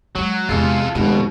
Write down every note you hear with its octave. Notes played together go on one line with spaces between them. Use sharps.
F#3 G#3
E2 C3 G#3 F4 A4
F1 B2 D#3 G#3